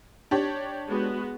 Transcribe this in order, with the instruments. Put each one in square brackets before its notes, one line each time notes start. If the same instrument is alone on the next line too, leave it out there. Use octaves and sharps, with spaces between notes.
[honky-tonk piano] D4 G4 C#5
[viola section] G#3 B3 F#4